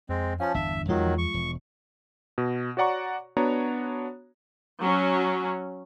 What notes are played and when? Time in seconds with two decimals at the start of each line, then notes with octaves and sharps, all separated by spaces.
0.09 F2 G#3 C4
0.40 F3 C#4 F5 A5
0.54 G1 E2 D4 E5
0.88 E2 D#3 F3 F#3 G#3 F4
1.18 C#6
1.34 E1
2.38 B2
2.77 F#4 C#5 D5 F#5 A#5 C#6
3.37 B3 D4 F#4 C#5 A#5
4.80 F#3 C#4